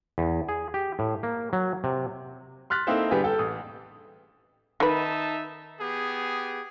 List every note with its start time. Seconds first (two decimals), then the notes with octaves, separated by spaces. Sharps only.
0.18 E2
0.49 G#4
0.74 G4
0.99 A2
1.23 A#3
1.53 F#3
1.84 C3
2.70 C6 F6 F#6 A6 B6
2.87 A#3 C4 D#4 E4 A4 C5
3.11 D3 G3 B3 G4 G#4
3.24 A4 G5
3.39 A1 D#6
4.80 D#3 D#4 B4 E5 A5
5.79 B3 G4 G#4